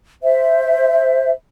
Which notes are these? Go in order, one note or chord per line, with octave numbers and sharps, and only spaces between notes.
C5 E5